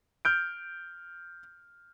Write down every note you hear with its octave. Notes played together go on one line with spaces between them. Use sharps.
F6 G6 D7